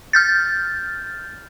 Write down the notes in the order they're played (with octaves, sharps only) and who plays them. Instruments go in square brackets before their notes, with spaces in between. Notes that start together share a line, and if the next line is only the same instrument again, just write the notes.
[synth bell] F6 G6 A6